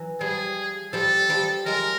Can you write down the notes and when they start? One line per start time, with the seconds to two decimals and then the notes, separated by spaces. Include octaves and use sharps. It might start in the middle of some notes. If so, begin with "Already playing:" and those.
Already playing: E3 F#3
0.21 F3 G3 G#4
0.93 F3 G3 A4
1.30 F3 G3
1.66 F#3 G#3 A#4